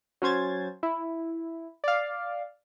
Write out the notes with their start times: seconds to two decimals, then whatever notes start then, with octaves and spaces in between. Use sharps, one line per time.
0.22 F#3 C#4 C5 G#6 A6
0.83 E4
1.84 D5 F5